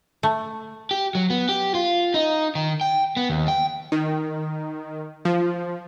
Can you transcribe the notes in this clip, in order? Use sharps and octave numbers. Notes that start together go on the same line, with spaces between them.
A3
G4
F#3
B3
G4
F4
D#4
D#3
G5
B3
D#2
G5
D#3
F3